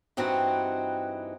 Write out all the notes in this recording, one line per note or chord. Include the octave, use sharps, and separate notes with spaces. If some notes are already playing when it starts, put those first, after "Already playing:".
G2 E3 C4 D#4 F#4